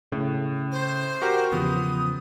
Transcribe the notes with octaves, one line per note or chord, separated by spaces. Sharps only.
A2 C#3
C5
F#4 G4 A#4
E2 C#3 F3 B3 D#6